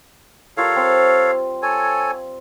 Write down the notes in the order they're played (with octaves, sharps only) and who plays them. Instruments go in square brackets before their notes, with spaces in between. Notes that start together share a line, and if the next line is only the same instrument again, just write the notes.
[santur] G3 F4 A#4 [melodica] A4 C#5 F5
[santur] C4 A5
[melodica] A4 C#5 G#5